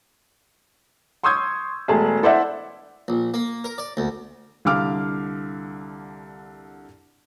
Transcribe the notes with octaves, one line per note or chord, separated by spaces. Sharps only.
C6 C#6 D#6 E6 G6 G#6
E1 A3 G#4 A5
E4 A4 C5 D5 E5 F#5
A#1
A#3
A#4
D5
D2
C2 D3 F5 D6 F6